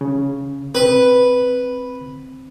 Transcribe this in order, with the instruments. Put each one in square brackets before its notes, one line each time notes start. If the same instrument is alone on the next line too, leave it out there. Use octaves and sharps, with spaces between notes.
[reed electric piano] C#3
[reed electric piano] C4 [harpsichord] B4